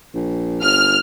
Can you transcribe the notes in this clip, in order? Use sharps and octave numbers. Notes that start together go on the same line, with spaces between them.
A#1
G1 F6